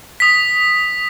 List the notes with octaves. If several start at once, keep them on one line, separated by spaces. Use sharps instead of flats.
D#6 B6